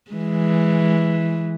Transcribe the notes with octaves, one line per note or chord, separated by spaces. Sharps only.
E3 G#3